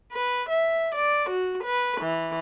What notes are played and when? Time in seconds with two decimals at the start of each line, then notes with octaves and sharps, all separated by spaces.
0.11 B4
0.48 E5
0.95 D5
1.29 F#4
1.64 B4
2.01 E3